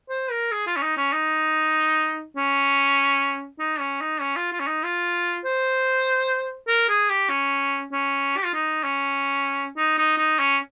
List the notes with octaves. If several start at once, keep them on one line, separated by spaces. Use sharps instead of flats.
C5
A#4
G#4
F4
C#4
D#4
C#4
D#4
C#4
D#4
C#4
D#4
C#4
F4
F4
C#4
D#4
F4
C5
A#4
G#4
G4
C#4
C#4
G4
F4
D#4
C#4
D#4
D#4
D#4
C#4